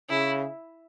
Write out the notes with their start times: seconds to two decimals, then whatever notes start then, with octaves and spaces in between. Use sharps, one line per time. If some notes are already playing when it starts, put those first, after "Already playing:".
0.09 C#3 E4